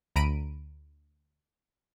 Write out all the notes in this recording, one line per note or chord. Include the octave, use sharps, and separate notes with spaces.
D2 A#5 B5 D7 D#7